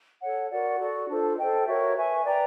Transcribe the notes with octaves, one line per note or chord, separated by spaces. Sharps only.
A4 C#5 F#5
F#4 A#4 D5 F#5
F#4 A4 D5
D4 F4 A4 C5
A4 C5 D#5 G5
F#4 A#4 C#5 E5
B4 E5 G#5 C#6
B4 D5 G5 A#5